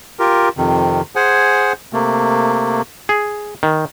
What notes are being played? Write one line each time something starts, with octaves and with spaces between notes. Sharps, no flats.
F4 G4 A#4
F2 C3 D#3
G#4 C5 F#5 G#5
C3 A3 A#3
G#4
D#3